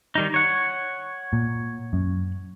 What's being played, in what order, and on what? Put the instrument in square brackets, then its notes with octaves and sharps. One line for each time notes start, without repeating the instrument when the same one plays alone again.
[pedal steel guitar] D#3 G3 D#4
C#5 F#5
[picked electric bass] A#2
F#2